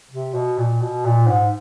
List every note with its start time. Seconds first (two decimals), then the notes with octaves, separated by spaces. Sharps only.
0.11 C3
0.34 B2
0.58 A#2
0.81 B2
1.05 A#2
1.28 G#2